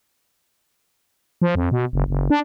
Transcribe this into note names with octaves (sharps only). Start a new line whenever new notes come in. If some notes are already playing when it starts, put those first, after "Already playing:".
F3
F2
B2
F#1
F#1
D4